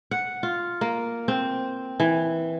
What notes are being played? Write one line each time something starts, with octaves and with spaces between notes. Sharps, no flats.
F#5
F4
A#3
C4
E3